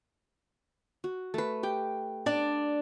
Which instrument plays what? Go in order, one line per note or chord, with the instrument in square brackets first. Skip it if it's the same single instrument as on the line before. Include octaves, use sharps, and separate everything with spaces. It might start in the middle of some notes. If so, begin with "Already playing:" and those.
[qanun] F#4
A3 B4
G4 G5
[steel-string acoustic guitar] D4 D5